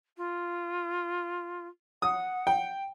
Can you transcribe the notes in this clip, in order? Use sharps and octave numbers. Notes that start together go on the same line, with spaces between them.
F4
F#5 D#6
G5